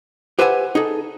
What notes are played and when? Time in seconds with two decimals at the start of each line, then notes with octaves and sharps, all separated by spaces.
0.39 G4 B4 C5 E5 F#5 G#5
0.75 D#4 G#4 A4